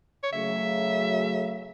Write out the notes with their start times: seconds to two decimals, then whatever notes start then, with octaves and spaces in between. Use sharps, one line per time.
0.23 C#5
0.33 C#3 F#3 A3 E5